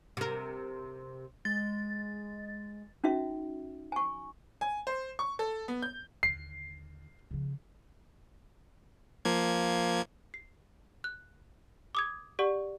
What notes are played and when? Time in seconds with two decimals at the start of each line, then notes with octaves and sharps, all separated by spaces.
0.17 C3 A#4
1.45 G#3 A6
3.04 C#4 D#4 F#4 E5
3.92 G#5 C#6
4.61 G#5
4.87 C5
5.19 C#6
5.39 A4
5.68 B3
5.82 G6
6.23 D#2 D3 C7
7.31 C#3 F3
9.25 F3 A#3 G#6
10.34 C7
11.04 F#6
11.95 D6 D#6 G#6
12.39 G4 D5 F#5 C#6